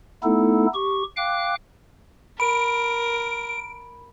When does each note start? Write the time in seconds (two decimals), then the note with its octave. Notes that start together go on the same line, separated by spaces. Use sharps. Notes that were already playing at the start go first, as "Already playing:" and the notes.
0.23 A3 B3 D#4 E4 A4
0.74 G4 C#6
1.17 F5 G5 D6 F#6
2.40 A#4 B5 D7